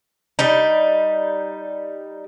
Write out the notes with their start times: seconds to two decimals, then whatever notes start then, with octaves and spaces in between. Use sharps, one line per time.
0.39 G3 D#4